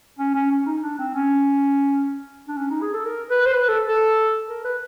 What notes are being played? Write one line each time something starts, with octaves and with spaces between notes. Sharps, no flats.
C#4
C#4
C#4
D#4
D4
C4
C#4
D4
C#4
D#4
G#4
A4
A#4
B4
C5
B4
A4
A4
A#4
B4